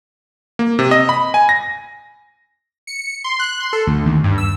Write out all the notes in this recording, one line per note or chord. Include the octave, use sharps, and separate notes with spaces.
A#3
C3
D#5
B5
G#5
A#6
C#7
C6
F#6
C6
A4
D2
D#2
G2
E6